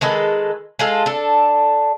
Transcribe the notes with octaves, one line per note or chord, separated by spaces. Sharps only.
D#3 G#3 A4 B4
G#3 F4 A4
D4 A4